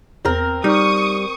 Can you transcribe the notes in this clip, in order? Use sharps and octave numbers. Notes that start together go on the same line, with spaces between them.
E2 C4 A#4
G3 D#4 C#6 D#6